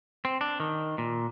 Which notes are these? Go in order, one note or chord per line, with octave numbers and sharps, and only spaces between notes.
C4
D4
D#3
A#2